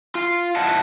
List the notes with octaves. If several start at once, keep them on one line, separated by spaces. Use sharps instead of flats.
F4
G#2 E4 D#5 F#5 A5